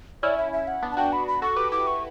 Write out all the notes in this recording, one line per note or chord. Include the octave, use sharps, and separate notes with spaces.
C#4 E4 D5
E5
E5
F#5
B3 D4
A5
D4 F#4 G5
B5
B5
F#4 A4 C#6
G4 B4 D6
E4 G4 D6
C#6